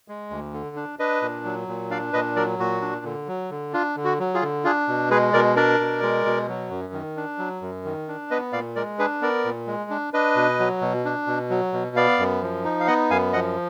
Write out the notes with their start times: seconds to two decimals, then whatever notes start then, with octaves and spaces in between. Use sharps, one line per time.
0.08 G#3
0.30 D2
0.53 D3
0.76 D4
0.99 D4 B4 D#5
1.22 A#2
1.45 F#3
1.68 A#2
1.90 D4 D5 F5
2.13 A#2 B4 D#5
2.36 F#3 A#4 D5
2.59 A#2 F#4
2.82 D4
3.05 D3
3.28 F#3
3.50 D3
3.73 D4 F4
3.96 D3
4.04 F#4
4.19 F#3
4.34 F4 G#4
4.42 D3
4.64 D4 F4 G#4
4.88 B2
5.11 G#3 G#4 B4
5.33 B2 A#4 D5
5.56 D4 A#4 D5
5.80 B2
6.03 G#3
6.26 B2
6.48 F#3
6.70 F#2
6.93 D#3
7.17 D4
7.39 F#3
7.62 F#2
7.84 D#3
8.08 D4
8.31 B3 B4 D#5
8.53 A#2 D5 F5
8.76 G#3 A#4 D5
8.99 D4 G#4 B4
9.21 B3 A#4 D5
9.45 A#2
9.67 G#3
9.91 D4
10.13 D4 B4 D#5
10.36 B2
10.59 F#3
10.81 B2
11.05 D4
11.27 B2
11.50 F#3
11.73 B2
11.96 B3 D5 F5
12.18 F#2
12.42 F3
12.65 D#4
12.80 F5
12.87 B3 D#5 F#5
13.10 F#2 F5 G#5
13.33 F3 D#5 F#5